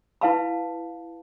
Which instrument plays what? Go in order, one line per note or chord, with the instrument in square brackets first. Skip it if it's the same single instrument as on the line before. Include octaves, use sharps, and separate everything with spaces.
[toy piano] E4 B4 F5 A5 B5